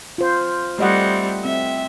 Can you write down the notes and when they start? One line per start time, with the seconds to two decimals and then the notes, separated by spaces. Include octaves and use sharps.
0.18 F4 C5
0.79 G3 A3 C4 D#5 F#5
1.45 C4 E5